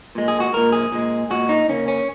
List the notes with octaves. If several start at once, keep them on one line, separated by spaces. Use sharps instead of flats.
A#2 G#3
G#4
F#4
A#2 G#3 A#4
G#4
A#2 G#3
A#2 G#3 F#4
D#4
C#3 A#3 C#4
C#4